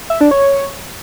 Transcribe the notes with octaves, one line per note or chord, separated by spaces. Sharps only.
E5
D4
C#5